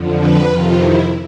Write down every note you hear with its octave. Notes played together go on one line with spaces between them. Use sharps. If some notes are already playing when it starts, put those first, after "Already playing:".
Already playing: F2 D3 F3
B4
F2 C3 D#3 F4
E4